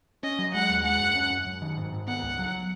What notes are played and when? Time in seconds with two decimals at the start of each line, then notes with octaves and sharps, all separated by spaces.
0.23 C#4 D#5
0.39 F#3
0.54 G#3 F#5
0.69 D#2
0.84 G#3 F#5
1.00 F#2
1.15 C#4
1.31 F#2
1.46 F#2
1.62 D#3
1.77 G#2
1.92 G#2
2.07 B3 F#5
2.23 C#2
2.38 F#3